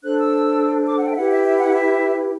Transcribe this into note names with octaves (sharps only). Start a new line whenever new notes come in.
D4 A4 C5 F#6
E6
D6
F#5
G5
E5
E4 G4 B4 F#5
E5
E5
F#5
E5